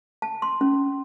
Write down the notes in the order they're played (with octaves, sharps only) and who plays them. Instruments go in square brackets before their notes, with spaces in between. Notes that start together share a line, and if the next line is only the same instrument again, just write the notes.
[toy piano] A5
C6
C#4